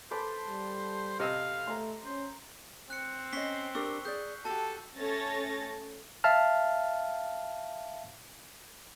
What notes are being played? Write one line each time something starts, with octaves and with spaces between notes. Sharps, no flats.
A4 B4 C5 D6
G3
C3 D#5 F5 E6
A3 A#5 C6
C#4 C5
C4 F#6 C#7
C#4 D#5 B6 C7 G7
D4 G4 A#4 C#6 E6
G#4 D5 G6
F#4 G4 A4 A5
A3 C#4 A4 C#5 A6 A#6
E5 F5 A5 F6